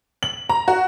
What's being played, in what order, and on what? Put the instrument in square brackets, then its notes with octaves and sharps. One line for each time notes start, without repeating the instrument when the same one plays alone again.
[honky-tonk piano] F#7
A#5
F#4